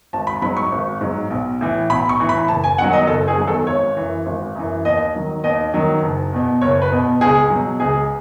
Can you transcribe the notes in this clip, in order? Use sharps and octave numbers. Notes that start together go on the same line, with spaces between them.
G#1 A5
B5
G#2 F#3 B5
C#6
G#1
G#2 F#3
B1
A2 E3
B1 B5
C#6
A2 E3
B5
F#1 A5
G#5
E2 D#3 F#3 F#5
D#5
F#1 A4
G#4
E2 D#3 F#3
A4
G#1 C#5
F#2 E3
G#1
F#2 E3
D#2 D#5
D#3 F#3
D#2 D#5
D#3 F#3
F#1
E2 B2
F#1 C#5
B4
E2 B2
C#2 G#4
B2 F#3
C#2 G#4